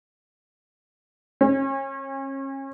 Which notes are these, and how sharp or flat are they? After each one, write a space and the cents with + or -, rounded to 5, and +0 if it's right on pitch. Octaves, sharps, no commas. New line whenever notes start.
C#4 -35